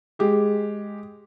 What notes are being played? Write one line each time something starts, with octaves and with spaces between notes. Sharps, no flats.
G#3 G4 G#4